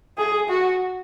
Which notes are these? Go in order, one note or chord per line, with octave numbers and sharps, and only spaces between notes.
G#4
F#4